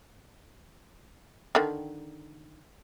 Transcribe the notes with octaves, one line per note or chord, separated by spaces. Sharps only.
D3 D#3